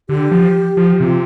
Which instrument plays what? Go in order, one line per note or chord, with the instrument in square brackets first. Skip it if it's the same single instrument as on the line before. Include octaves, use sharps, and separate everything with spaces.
[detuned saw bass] D3 [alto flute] G4
[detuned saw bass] F3
F3
[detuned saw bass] C3 [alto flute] F4